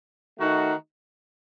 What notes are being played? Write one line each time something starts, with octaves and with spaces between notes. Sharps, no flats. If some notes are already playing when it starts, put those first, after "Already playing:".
D#3 A3 D#4 F#4